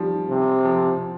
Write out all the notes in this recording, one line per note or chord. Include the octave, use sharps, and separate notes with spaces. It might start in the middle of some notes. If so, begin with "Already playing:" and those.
Already playing: D#3 F3 G3
C3
F3